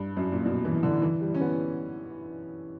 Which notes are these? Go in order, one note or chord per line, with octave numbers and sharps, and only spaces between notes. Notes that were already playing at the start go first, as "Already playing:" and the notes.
Already playing: G2
F#2
A#2
B2
E3
D3
E3
G3
C#4
B3